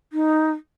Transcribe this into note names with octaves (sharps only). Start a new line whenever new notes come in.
D#4